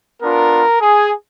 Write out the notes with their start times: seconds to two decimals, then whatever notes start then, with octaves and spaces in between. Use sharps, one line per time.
0.22 B3 D4 F4 A#4
0.81 G#4